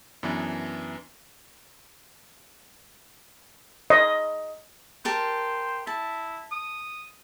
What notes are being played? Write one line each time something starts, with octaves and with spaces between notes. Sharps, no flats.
F#2 E3 B3 D4
D#5
G4 A#4 C5 A5
E4 A5
D#6